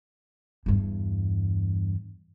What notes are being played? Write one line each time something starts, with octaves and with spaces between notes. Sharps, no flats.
E2 G2